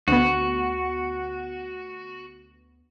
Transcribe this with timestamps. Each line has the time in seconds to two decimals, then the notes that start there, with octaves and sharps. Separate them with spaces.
0.08 D2 B3 F#4